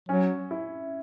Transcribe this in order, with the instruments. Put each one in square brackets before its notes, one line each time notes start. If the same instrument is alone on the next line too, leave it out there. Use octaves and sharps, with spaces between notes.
[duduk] F#3 [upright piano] C#4
[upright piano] E4